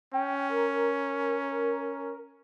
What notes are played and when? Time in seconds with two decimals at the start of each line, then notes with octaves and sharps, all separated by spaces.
0.14 C#4 G5
0.50 A#4